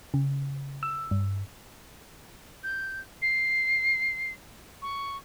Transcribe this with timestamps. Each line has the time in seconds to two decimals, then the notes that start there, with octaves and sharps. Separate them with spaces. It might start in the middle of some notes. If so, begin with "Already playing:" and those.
0.14 C#3
0.83 E6
1.11 G2
2.63 G6
3.22 C7
4.82 C#6